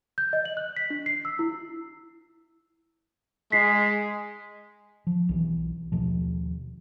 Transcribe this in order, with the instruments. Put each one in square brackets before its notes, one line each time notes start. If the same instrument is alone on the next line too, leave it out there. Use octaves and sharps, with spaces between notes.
[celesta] G6
D#5
F#7
F#6
B6
D4
C7
E6
E4
[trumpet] G#3 [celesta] B6 C7
[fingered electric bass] F3
B1 E3
D#2 B2 F3